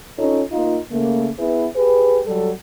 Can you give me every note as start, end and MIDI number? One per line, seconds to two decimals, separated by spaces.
0.19 0.43 61
0.19 0.43 63
0.19 0.43 65
0.19 0.43 69
0.19 0.43 73
0.52 0.79 58
0.52 0.79 63
0.52 0.79 65
0.92 1.30 49
0.92 1.30 57
0.92 1.30 58
1.39 1.67 59
1.39 1.67 64
1.39 1.67 68
1.39 1.67 71
1.76 2.21 67
1.76 2.21 68
1.76 2.21 71
2.27 2.51 54
2.27 2.51 55
2.27 2.51 69